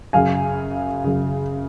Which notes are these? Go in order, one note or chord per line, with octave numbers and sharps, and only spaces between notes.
F#2 C#3 F5 G#5
F#2 C#3